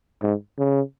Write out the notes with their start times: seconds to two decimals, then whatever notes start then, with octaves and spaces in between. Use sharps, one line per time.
0.23 G#2
0.59 C#3